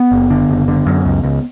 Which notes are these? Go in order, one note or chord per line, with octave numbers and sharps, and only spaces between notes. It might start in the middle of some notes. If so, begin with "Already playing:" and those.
Already playing: B3
F#1
D3
F#1
D3
F#2
C#2
C#2